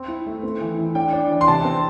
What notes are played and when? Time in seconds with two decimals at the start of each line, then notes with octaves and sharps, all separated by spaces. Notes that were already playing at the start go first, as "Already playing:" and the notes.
Already playing: C4
0.08 E4
0.26 A3
0.43 C4
0.61 E3
0.78 E4
0.95 D4 G5
1.13 D4
1.31 E3
1.41 C6
1.48 C3 A5
1.65 C4